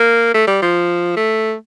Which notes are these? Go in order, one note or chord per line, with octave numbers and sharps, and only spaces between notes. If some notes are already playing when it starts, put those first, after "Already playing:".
Already playing: A#3
A3
G3
F3
A3